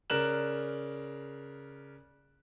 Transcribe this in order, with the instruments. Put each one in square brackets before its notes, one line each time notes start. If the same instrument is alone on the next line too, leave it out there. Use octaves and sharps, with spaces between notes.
[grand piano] C#3 A#4 D5 F#6 E7 F#7